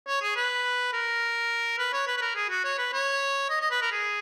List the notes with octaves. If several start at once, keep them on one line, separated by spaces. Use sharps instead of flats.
C#5
G#4
B4
A#4
B4
C#5
B4
B4
A#4
G#4
F#4
C#5
B4
C#5
D#5
D#5
B4
A#4
G#4